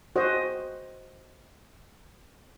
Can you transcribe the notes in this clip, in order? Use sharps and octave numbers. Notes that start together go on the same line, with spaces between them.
F#4 C5 D#5